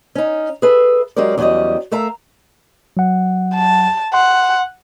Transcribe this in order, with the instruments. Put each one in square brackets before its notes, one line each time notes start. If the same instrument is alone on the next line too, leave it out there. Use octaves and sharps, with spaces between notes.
[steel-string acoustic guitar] C#4 D#4
G#4 A4 B4 E5
F#3 G#3 C#4 G4 A#4 D5
E2 F#3 G3 C#4 D5 D#5
A3 A#4 E5 F5 A#5
[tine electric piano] F#3 F#5
[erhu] A5
[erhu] F#5 [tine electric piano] C6